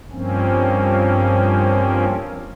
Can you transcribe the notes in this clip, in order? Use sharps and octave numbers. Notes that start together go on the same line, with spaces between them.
G2 F3 A#3 C4 C#4